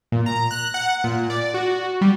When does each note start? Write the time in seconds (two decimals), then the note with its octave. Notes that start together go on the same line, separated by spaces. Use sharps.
0.12 A#2
0.26 A#5
0.51 F#6
0.74 F#5
1.04 A#2
1.30 D5
1.54 F#4
2.01 G3